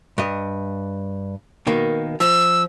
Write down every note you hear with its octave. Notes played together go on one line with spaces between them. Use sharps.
G2 D#5
B2 D#3 A#3
F3 E6